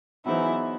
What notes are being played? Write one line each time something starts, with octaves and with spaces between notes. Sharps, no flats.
E3 F#3 B3 D#4 E4 G#4 C5